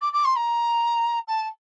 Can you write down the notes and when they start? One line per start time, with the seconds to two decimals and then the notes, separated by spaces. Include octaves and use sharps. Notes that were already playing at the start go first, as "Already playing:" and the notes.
0.01 D6
0.13 D6
0.24 C6
0.36 A#5
1.27 A5